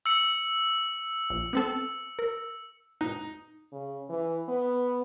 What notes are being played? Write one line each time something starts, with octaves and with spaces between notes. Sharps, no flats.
E6 C#7
A#1
B3 C4 A4
A#4
D#4
C#3
E3
B3